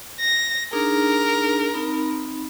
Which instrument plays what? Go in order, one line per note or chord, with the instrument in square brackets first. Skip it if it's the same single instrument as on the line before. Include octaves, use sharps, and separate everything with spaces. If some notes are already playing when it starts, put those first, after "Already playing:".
[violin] A#6
[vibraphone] D4 D#4 G#4 [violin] A#4
[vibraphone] C4 D#4 B5